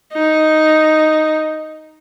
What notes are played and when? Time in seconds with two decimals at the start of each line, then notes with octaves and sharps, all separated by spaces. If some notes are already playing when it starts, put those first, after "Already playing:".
0.13 D#4